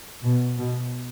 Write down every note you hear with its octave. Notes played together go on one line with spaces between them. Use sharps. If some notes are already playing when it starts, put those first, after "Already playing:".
B2
B2